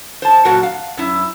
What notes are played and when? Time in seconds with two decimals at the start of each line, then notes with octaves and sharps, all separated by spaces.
0.22 C5 A5
0.45 A#2 F#3 F#4 A#4 F#5 A5
0.63 F5
0.97 F#2 E4